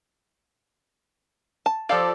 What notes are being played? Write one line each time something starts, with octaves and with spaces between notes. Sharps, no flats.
A5
F3 G4 A4 D5 F5